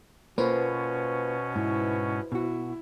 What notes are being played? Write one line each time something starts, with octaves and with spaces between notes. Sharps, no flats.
B2 A#3 C#4 F4 B4 C5
G#2 E4
B2 E4 F#4